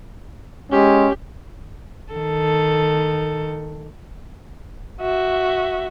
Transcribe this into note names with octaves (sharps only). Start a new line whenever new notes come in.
G#3 C#4 G4
D#3 A4
F#4 E5